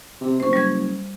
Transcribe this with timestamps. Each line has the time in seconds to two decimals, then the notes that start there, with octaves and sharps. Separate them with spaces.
0.21 C3
0.40 F#1 C5 C#6
0.53 G3 C#6 G#6